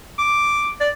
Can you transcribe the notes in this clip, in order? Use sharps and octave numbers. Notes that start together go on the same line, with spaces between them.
D6
D5